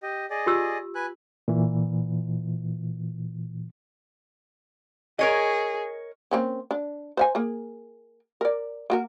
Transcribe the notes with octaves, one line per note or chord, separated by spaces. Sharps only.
G4 D#5
G#4 D5 D#5
F4 G4 E6
B4 G#5 F#6
A#2 E3
G#4 A#4 C#5 D#5
A#3 C4 C#4
D4
C5 F5 G#5
A#3 G#4
A#4 D5
A#3 F#4 A#4